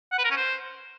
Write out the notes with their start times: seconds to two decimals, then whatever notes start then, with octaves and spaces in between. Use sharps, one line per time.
0.12 F#5
0.18 B4
0.24 A#4
0.30 C#4
0.37 C5